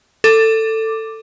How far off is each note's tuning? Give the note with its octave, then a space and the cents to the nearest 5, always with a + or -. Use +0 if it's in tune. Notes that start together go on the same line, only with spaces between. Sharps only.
A4 +15 D6 +0